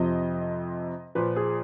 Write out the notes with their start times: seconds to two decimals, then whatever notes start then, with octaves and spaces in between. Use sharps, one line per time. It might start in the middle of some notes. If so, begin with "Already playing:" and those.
Already playing: F2 C3 F3 D#5
1.15 A#2 F3 B4
1.36 G#4